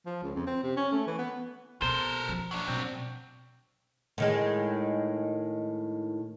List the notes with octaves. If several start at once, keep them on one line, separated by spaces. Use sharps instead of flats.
F3
C#2
F2
C4
C3
C#4
A3
E3
B3
B2 B3 A4 A#4 C5
F3 G3
F#3 D4
B2 C4
A2 D#3 G#3